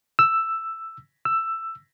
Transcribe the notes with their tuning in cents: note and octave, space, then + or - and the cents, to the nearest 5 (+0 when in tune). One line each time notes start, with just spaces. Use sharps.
E6 +5
E6 +10